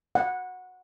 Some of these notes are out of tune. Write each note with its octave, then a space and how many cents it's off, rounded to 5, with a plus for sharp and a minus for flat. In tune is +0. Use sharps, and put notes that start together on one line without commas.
F#5 -10